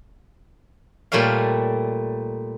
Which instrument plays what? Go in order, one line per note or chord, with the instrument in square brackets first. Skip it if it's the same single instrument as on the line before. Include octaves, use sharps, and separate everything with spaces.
[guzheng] A#2 G3 A3 C#5 F5